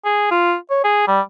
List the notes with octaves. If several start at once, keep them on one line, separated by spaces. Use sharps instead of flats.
G#4
F4
C#5
G#4
G3